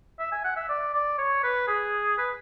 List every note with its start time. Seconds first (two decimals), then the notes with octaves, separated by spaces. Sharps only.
0.19 E5
0.32 G#5
0.44 F#5
0.56 E5
0.69 D5
0.94 D5
1.18 C#5
1.44 B4
1.67 G#4
2.18 B4